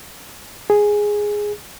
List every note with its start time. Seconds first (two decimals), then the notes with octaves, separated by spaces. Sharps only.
0.70 G#4